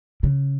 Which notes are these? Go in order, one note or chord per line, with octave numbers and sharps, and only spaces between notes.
C#3